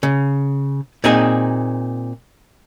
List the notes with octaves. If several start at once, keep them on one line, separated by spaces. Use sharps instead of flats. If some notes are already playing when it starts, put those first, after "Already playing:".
C#3
A#2 C4 D#4 G#4